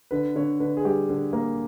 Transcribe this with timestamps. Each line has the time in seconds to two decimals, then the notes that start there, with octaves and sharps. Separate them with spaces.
0.11 D3 B4
0.36 D3 C#5
0.60 D3 B4
0.77 G#4
0.85 G3 G4
1.09 D3
1.33 A#3